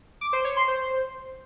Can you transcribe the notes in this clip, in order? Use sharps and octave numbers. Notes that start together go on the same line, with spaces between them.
D6
C5
C#5
C6
C5